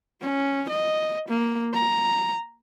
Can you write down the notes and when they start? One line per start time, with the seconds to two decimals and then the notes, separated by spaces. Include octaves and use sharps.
0.21 C#4
0.69 D#5
1.28 A#3
1.73 A#5